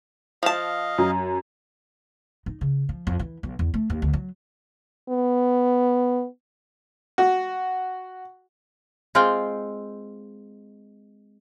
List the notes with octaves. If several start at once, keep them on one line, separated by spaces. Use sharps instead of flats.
F3 D#5 F5 A5
F#2
D#4
C#3
F3
F2
E3
B1
E2
A3
D#2
D2
F#3
B3
F#4
G#3 C4 F4 F5 G5